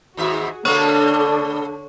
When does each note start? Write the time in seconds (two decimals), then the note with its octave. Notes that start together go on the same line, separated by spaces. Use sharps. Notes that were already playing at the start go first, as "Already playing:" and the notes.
0.17 D#2 G#2 F#4 G#4 E5
0.65 B2 D3 A3 B3 D4 C#5 C#6